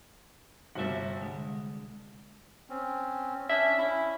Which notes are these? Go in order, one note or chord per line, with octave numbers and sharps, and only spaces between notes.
G1 C3 G3 F#4 E5
C2 D3 G#3
C4 C#4
C#4 D4 E5
C#4 E4